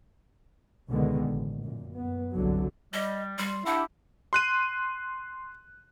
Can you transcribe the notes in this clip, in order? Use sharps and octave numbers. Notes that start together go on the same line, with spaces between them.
C#2 B2 D3 D#3 G#3 B3
A1
F#2 A#2
F#2 B3
G1 C2 D3 F#3
G3 D#5
G3 C6
D4 E4 G4 F#5
C6 F#6 D#7